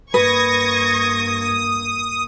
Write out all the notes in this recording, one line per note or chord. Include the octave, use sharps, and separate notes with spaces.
G2 A#3 B4 C#6 D#6 G#6 A#6